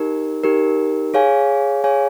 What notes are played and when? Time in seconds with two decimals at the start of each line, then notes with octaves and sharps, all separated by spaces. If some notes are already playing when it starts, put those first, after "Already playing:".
Already playing: D#4 G4 A#4
0.44 D#4 G4 A#4
1.14 G#4 C#5 F5 G#5
1.84 G#4 C#5 F5 G#5